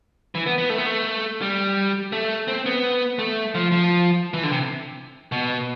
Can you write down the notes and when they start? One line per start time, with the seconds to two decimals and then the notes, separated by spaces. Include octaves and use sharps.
0.35 E3
0.46 B3
0.58 B3
0.70 A3
0.78 B3
0.86 A3
1.42 G3
2.12 A3
2.48 C4
2.66 B3
3.19 A3
3.55 F3
3.72 F3
4.34 E3
4.43 D3
4.52 C3
5.32 B2